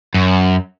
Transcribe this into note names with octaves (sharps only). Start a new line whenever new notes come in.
F#2